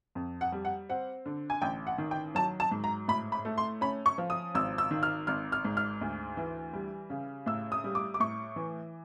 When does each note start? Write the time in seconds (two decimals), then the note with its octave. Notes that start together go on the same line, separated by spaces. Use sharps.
0.15 F2
0.41 F#5
0.52 G3
0.65 F#5
0.89 C4 F#5
1.26 D3
1.50 G#5
1.62 A1 G5
1.87 F#5
1.98 D#3
2.11 G5
2.35 F#3 A5
2.60 A5
2.71 G#2
2.84 A#5
3.08 A2 B5
3.32 B5
3.45 A3
3.58 C6
3.81 C#4 B5
4.06 C#6
4.18 F3
4.30 D#6
4.55 G#1 E6
4.78 E6
4.91 D#3
5.03 F6
5.27 G#1 F6
5.52 F6
5.65 G#2
5.77 F6
6.01 D2
6.37 E3
6.73 G3
7.10 C#3
7.46 A2 E6
7.72 D#6
7.84 G3
7.95 D6
8.14 D6
8.20 A2 C#6
8.56 E3